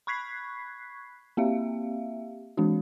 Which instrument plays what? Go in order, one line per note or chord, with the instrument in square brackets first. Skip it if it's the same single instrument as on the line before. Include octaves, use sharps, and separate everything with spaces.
[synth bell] B5 C#6 F#6 G#6 B6 C7
A#3 C4 G4 E5 F5
E3 G#3 C4 D4 F#4